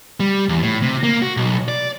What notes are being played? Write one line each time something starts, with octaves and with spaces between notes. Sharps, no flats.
G3
E2
A2
C3
A#3
F#4
B1
D5